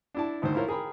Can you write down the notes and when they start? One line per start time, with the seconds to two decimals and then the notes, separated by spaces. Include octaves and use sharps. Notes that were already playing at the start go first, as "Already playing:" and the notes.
0.15 D4 E4 A5
0.42 G#1 D2 D#3 C5
0.55 E4 F4 A#4 C5 C#5
0.68 G#4 A#4 G5 B5